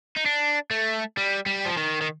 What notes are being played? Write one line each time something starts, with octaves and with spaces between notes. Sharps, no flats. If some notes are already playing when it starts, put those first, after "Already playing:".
D#4
D4
A3
G3
G3
F3
D#3
D#3